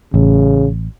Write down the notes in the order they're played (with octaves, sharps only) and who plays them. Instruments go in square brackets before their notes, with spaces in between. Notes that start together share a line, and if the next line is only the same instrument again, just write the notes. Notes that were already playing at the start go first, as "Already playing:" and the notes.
[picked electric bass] A1 [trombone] C#3